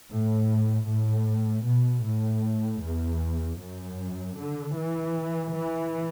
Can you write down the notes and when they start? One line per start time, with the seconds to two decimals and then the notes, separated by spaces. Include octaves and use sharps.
0.10 A2
0.89 A2
1.66 B2
2.04 A2
2.83 E2
3.60 F#2
4.38 D3
4.77 E3
5.55 E3